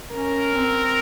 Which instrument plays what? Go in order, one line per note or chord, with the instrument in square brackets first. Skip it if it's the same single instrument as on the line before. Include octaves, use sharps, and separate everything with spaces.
[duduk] C#4 [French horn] A#4
[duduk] C4